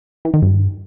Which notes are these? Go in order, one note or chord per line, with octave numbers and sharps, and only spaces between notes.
E3
D#3
G2